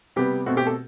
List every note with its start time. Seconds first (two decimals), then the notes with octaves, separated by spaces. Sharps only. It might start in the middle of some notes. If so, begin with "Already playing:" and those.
0.16 C3 G3 B3 G4
0.46 B2 A3 C4 F#4
0.57 G4
0.67 A4